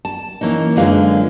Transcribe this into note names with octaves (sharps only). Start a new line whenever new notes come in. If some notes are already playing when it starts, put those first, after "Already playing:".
A5
E3 A#3 C#4 D#4
F#2 D3 G#3 F4 B4 F5